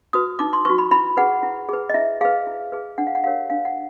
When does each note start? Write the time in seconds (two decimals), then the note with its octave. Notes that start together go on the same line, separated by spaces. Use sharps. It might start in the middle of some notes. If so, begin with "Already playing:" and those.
0.13 F#4 B4 D#6
0.39 D#4 D6
0.53 C6
0.65 F#4 B4 C#6
0.78 B5
0.91 E4 B5
1.17 G#4 B4 F#5
1.43 E4
1.69 G#4 B4
1.89 D#5
1.94 E4 E5
2.21 G#4 B4 F5
2.47 E4
2.72 G#4 B4
2.98 D4 F#5
3.07 F5
3.15 F#5
3.24 G4 A#4 C#5 F5
3.50 D4 F5
3.65 F#5